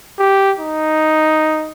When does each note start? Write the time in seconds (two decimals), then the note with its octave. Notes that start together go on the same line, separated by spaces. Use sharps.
0.19 G4
0.59 D#4